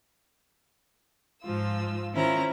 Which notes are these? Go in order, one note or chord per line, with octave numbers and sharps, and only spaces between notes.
G#2 F3 F4 E6
D#3 C#4 E4 F4 C5 A#5